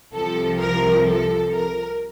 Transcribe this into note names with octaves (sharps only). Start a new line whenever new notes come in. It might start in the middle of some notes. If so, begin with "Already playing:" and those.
C2 C3 F3 A4
A#4
A4
A#4